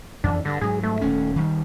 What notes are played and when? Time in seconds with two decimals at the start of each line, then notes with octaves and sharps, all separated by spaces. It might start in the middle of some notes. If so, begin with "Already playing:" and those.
0.24 F2 E3 D4
0.45 G2 D3
0.61 G#2 F#3 G#4
0.83 A3
1.01 D#1 C#4
1.36 D#3 G3